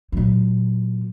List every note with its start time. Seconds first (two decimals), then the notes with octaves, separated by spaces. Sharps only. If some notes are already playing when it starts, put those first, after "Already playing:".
0.12 A#2 F#3